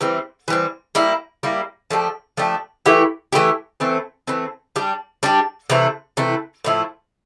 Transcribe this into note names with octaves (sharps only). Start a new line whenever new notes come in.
E3 G3 C4
E3 G3 C4
G3 A#3 E4
G3 A#3 E4
F3 A3 D4 G4
F3 A3 D4 G4
E3 A3 E4 G4
E3 A3 E4 G4
E3 A3 C4
E3 A3 C4
G3 D4 G4
G3 D4 G4
C3 E3 A3 E4
C3 E3 A3 E4
A2 F3 A3 E4